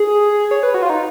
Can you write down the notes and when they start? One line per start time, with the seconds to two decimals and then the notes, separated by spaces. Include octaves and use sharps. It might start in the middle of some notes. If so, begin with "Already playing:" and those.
Already playing: G#4
0.51 C#5
0.63 B4
0.74 F#4
0.82 F4
0.90 D#4